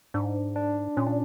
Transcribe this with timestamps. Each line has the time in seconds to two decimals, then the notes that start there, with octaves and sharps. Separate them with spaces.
0.14 G#2 D4
0.56 D4
0.97 A#2 C#4
1.07 D4